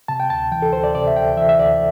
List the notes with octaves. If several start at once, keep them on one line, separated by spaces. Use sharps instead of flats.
C3 A5
G5
D2 A5
E3 G5
A4
D2 C5
D5
C3 D5
E5
D2 G5
E3 E5
E5
D2 D5